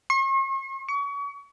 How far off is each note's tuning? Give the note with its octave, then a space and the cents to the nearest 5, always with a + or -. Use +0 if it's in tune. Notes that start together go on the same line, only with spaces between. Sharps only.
C#6 -45
C#6 +35